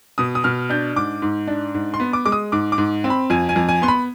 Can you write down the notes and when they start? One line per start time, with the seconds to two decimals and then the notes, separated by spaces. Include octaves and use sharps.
0.18 B2 D#6
0.35 D#6
0.44 B2 F6
0.70 D4 G6
0.96 G#2 D6
1.22 G#2
1.48 D4
1.74 G#2
1.94 C6
2.00 B3
2.13 D6
2.26 G#3 D6
2.32 D#6
2.52 G#2 D6
2.72 D6
2.78 G#2
3.04 C4
3.10 B5
3.30 F2 G#5
3.49 G#5
3.56 F2
3.69 G#5
3.82 B3 C6
3.88 B5